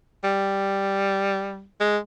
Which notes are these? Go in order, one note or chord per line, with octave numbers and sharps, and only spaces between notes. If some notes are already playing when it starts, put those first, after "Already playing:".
G3
G#3